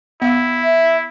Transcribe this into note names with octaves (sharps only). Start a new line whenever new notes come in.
B3 E4 F5
E5